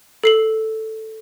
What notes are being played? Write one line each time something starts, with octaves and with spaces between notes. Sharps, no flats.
A4 C7 F#7